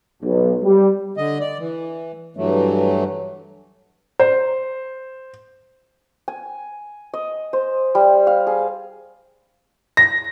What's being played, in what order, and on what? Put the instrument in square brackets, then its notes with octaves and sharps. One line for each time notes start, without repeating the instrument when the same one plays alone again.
[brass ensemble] B1
G3
[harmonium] D3 D#5
D5
E3
G2 E3 F#3 A3
[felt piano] C5
[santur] G#5
D#5
C5
G3
F5
G#4
[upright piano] A#6